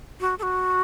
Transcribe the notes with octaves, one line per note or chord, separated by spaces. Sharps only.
F#4
A4
F#4